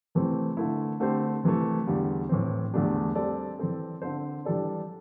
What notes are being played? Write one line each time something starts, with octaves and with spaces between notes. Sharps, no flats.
C3 E3 A3 C4
D3 A3 E4
D3 A3 C4 G4 C5
C3 E3 A3
E2 D3 G3
A2 E3 C4
E2 D3 A3 D4 G4
G3 C4 A4 D5
E3 C4 A4
D3 C4 A4 C5
E3 G3 D4 A4 D5